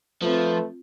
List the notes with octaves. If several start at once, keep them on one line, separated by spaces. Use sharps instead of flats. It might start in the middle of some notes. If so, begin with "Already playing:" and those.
F3 A3 C4 F4 B4